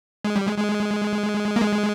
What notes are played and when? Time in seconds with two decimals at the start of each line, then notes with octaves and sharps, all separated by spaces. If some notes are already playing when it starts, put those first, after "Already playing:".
0.25 G#3
0.36 G3
0.47 G#3
0.58 G#3
1.56 A#3
1.62 G#3